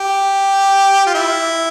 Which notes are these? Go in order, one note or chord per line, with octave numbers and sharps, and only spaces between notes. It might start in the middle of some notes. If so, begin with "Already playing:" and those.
Already playing: G4
F4
E4